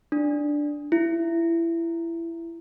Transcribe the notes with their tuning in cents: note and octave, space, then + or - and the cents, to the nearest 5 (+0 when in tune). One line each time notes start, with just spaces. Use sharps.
D4 +0
E4 +20